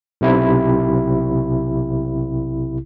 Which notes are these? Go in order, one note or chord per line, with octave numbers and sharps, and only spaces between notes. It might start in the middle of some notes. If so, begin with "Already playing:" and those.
B1 C3 E4